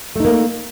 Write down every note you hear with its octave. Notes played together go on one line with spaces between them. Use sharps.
A3 A#3 D#4